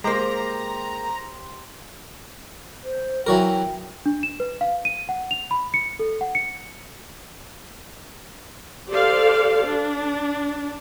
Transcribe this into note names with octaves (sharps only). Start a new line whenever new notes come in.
G#3 A#3 G4 C5 A#5
C5
E3 F#3 A#4 G5
D4
E7
B4
F5
D#7
F#5
F7
B5
C#7
A4
F#5
C#7
G4 A4 C5 D5 F5
D4